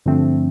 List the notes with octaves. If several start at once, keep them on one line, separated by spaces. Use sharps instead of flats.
G2 D3 F3 A3 C4